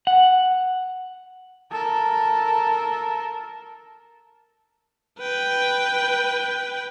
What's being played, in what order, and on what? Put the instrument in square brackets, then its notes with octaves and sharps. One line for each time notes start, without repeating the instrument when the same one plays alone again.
[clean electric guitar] F#5
[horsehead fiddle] A4 A#4
[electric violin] B4 G5